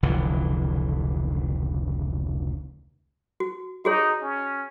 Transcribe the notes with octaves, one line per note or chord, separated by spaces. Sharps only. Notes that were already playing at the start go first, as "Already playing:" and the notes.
F1 C#2 D3 E3
F#4
D#4 F#4 G#4 C#5
C#4